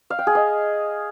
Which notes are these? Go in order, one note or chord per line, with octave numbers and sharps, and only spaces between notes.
F5
G5
G#4
D#5